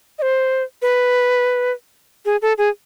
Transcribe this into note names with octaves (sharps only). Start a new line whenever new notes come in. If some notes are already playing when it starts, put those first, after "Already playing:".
D#5
C5
B4
G#4
A4
G#4